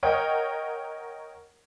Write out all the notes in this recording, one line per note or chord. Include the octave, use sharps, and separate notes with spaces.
A#4 C#5 D#5 F#5 G5